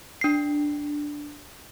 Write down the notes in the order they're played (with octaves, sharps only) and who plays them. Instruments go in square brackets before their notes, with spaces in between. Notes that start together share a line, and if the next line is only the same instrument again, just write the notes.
[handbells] D4 C7